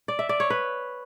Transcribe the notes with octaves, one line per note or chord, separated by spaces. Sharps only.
D5
E5
D5
C#5
B4